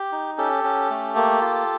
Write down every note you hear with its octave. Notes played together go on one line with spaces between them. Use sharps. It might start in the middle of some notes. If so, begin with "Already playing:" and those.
Already playing: G4
D#4
C#4 G4 A4
C#4
A3
A#3
F4